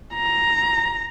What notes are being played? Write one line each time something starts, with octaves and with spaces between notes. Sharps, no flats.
A#5